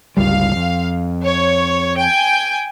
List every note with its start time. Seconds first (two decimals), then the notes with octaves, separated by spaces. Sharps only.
0.17 G1 C#2 G3 F5
0.56 F2
1.23 C#5
1.96 G5 G#5